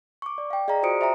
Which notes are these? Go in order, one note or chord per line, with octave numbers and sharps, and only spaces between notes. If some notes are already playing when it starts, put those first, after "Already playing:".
C#6 D6
D5
F5 G5
G#4 D5 D#5 F5 A#5
F4 F#4 C5 D#6 C#7 D7
C5 E5 G5 A#5